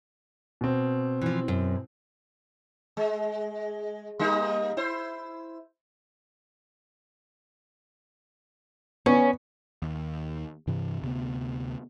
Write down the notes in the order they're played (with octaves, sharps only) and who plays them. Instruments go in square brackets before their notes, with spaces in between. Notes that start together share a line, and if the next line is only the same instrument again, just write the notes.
[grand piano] B2 C4
[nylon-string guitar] E3 F3
F#2
[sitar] G#3
G3 A#3 D#4
E4 C5
[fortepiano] B3 [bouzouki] C#4
[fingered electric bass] D#2
G2 C3 E3
D2 C3 B3